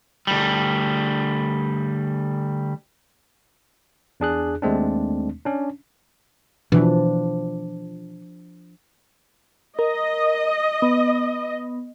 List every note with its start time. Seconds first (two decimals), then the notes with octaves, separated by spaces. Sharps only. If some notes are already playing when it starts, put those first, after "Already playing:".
0.27 D2 G3
4.20 E2 D4 G#4 F#6
4.62 D#2 G#3 A3 C4 D4
5.45 C#4 D4
6.72 B2 E3 F3 D4
9.79 A#4 D#5
10.82 B3